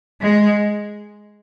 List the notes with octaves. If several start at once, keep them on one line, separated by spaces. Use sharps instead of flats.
G#3